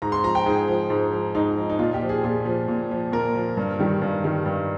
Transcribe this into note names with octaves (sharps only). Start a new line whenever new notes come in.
G#2 A#5
C6
F3 A#5
G5
G#2 G#4
F3
G#2
F3
G#2 D#4
F3
D#4
A#2 F4
G4
F3
G#4
A#2 G#4
F3
A#2
F3
A#2 A#4
F3
G2
D#3 G3
G2
D#3 G3
G2